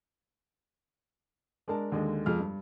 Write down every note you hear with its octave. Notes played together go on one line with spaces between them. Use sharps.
G#3 D4 A#4 A5
D#2 D3 G#3 D#5
F2 G#3 G#4 F6
G2